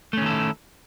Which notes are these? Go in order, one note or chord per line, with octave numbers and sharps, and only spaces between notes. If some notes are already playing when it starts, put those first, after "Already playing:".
D#3 A3 C#4 E4 A4